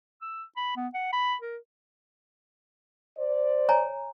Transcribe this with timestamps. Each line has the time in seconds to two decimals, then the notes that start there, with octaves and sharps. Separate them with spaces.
0.22 E6
0.57 B5
0.76 B3
0.94 F#5
1.13 B5
1.41 A#4
3.18 C5 D5
3.69 C#5 G#5 A#5